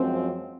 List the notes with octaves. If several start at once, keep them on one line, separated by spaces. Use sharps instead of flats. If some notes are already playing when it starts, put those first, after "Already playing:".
Already playing: F#2 F3 G#3 C4